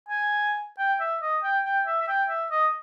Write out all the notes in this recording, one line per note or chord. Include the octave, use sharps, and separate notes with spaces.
G#5
G5
E5
D#5
G5
G5
E5
E5
G5
E5
D#5